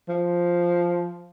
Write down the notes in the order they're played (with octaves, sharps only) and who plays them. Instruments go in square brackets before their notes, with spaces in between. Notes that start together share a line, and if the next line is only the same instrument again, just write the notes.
[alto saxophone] F3